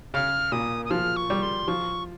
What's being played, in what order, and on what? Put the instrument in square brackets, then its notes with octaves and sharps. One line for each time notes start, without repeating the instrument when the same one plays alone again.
[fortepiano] C#3 [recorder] F6
[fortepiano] A#2 [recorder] D#6
[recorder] D#6
[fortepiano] F3 [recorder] F6
[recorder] C#6
[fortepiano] G3
[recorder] C6
[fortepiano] F3 [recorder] C#6